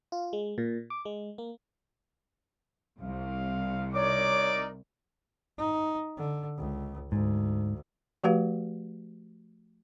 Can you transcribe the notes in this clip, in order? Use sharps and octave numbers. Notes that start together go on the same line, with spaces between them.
F4
G#3
A#2
D6
G#3
A#3
C2 C3 F5
D#4 A#4 C#5 D5 D6
D#4
D3
C#2
D2 G#2
F3 A3 F#4 G4 B4 F5